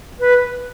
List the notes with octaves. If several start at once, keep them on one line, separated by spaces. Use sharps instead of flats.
B4